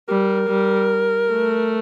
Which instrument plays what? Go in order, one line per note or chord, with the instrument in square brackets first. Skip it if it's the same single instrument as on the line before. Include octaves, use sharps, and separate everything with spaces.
[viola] G3 [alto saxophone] A#4
[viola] G3
A3